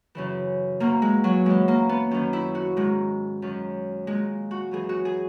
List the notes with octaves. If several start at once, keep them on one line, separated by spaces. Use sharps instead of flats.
F#2 C#3 E3
E2 B2 A#3
G#3
F#3
F#2 E3 G#3
A#3
B3
F#2 D#3 C#4
E4
F#4
G#2 D#3 G#3
F#2 D#3
A#2 G#3
F#4
F#2 E3 G#4
F#4
G#4